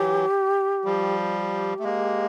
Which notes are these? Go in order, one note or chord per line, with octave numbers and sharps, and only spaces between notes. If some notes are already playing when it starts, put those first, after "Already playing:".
Already playing: E3 F#3 G4
F3 G3
G4
A3
G#3 A#3